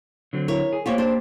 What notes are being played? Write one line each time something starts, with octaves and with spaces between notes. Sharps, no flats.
D3 F#3 C4
E4 A#4 C#5
G#4
A#3 F4 G4 C5 C#5
D4 C5